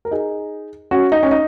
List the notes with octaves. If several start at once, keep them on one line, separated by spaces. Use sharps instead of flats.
A#4
D#4 G#4
C#4 F#4
D#4
C#4
D#4